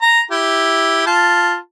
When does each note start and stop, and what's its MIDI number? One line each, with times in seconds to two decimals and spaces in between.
0.02 0.21 82
0.31 1.06 64
0.31 1.06 67
1.06 1.56 65
1.06 1.56 81